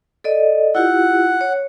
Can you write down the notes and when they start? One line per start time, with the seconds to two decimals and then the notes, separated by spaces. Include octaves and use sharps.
0.24 A4 D5 D#5
0.75 E4 F4 G4 F#5
1.41 C#5